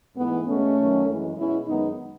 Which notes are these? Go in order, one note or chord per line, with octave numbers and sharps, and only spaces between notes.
G#2 E3 A3 B3
B2 G#3 A3 C#4
F#2 D#3 F#3
F#2 E3 G#3
B2 G#3 C#4 E4
F#2 D#3 G#3 B3 D#4